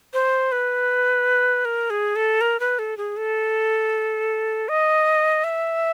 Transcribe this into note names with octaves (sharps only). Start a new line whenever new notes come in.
C5
B4
A#4
G#4
A4
A#4
B4
A4
G#4
A4
D#5
E5